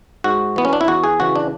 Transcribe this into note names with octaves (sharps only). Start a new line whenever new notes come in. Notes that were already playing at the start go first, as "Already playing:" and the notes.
G#2 F#4
E3 B3
C#4
D4
E4
E2 F#4
G#4
C#3 E3 F#4
D4